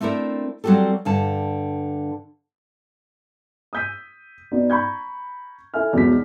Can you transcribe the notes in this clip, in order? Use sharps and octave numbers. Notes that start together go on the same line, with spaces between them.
A3 C4 D4 E4 A#4
F#3 G3 C4 F#4 G4 A4
G2 D3 A5
D#6 E6 G6 B6 D#7
B3 D#4 F#4 D5
A#5 B5 C#6 G6 G#6
E4 A4 E5 G#5 F6
E2 B2 F#3 G#3 D#4 B6